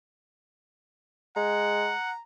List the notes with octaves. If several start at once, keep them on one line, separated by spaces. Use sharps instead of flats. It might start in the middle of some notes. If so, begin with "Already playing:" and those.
G#3 F#5 A#5